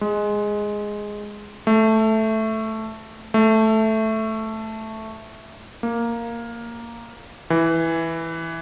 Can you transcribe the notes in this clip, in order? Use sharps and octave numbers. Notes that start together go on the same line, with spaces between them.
G#3
A3
A3
A#3
E3